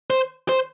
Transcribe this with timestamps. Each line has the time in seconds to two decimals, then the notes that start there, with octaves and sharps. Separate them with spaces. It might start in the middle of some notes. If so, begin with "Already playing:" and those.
0.10 C5
0.49 C5